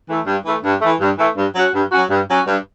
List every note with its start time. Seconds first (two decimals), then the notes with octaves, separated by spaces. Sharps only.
0.09 E3 A3
0.27 G2
0.45 E3 A3
0.64 G2
0.81 E3 A3
1.00 G2
1.18 E3 A3
1.37 G2
1.55 F#3 C#4 F#4
1.74 G2
1.92 F#3 C#4 F#4
2.10 G2
2.29 F#3 C#4 F#4
2.46 G2